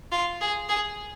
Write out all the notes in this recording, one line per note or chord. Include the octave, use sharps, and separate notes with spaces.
F4
G#4
G#4